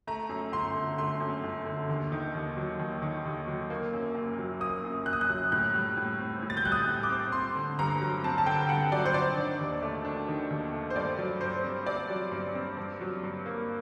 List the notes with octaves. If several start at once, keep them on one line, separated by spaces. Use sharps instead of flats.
A3 A#5
F#2
G1 C6
D3
A3 C6
F#2
G1
D3
D#2
D#3
D#2
F#3
D#2
D#3
D#2
F#3
A#3
F#2
F#1
F#3
A#3 D#6
F#2
F#1 F#6
D#6
F#6
F#3
A2 F#6
G3
A2
C4
A2
A6
G6
G3 F#6
D#6
A2
D6
C4
C4 C6
D3
G2 A#5
F#3
C4 A5
A5
D3 G5
G2 F#5
F#3 D5
C5
D4 D5
D#3
D#2
A3
D4
D#3
D#2
A3
C5
G2 D5
F#3
G2 C5
C4
G2 D5
F#3
G2
C4
G2
F#3
G2
A#3